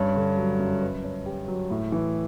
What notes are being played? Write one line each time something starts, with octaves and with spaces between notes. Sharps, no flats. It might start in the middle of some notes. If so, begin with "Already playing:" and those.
Already playing: G2 C#4
D3
F#3
F#2
B4
C#4
G4
F#3
A2
E3